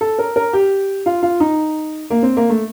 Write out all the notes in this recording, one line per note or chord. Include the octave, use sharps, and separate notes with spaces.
A4
A#4
A#4
G4
F4
F4
D#4
A#3
C4
A#3
A3